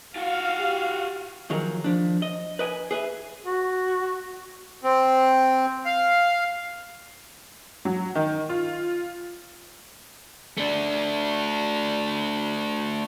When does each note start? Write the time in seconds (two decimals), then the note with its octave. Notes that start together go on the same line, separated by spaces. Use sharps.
0.16 F4 F#4 F5
0.60 G4
1.50 D#3 F3 F#3 G#4 A#4
1.84 F3 D4
2.22 D#5
2.59 B4 D#5 G5 G#5
2.91 G#4 B4 E5
3.45 F#4
4.84 C4
5.85 F5
7.85 F#3
8.15 D#3
8.49 F4
10.58 A3 D4